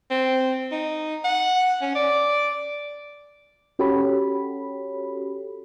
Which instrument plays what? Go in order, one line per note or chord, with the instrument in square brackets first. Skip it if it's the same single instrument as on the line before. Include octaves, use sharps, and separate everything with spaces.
[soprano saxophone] C4
D#4
F#5
C#4
D5
[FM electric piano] C#4 F#4 G4 A4 C#5 B5